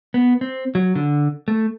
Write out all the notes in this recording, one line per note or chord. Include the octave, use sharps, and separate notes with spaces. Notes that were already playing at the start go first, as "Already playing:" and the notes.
B3
C4
F#3
D3
A3